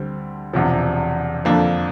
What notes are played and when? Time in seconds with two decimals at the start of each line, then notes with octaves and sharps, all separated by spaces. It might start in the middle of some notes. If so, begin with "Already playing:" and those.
Already playing: D2 D3 G3 C4
0.53 E1 E2 C3 F3
1.45 F2 D3 F3 A#3 D4